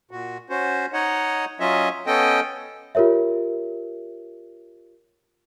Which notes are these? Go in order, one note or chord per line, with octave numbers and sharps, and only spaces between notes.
A#2 F#4
C#4 F#4 C5
D#4 C#5 D#5 F#5
F#3 C#4 F4 D#5 E5
B3 C#4 A4 D#5 G5
F4 G4 A#4 C#5 E5